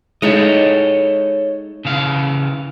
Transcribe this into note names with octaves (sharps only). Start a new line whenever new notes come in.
G#3 D#4 E4 A4 C#5 D#5
C#3 E3 F5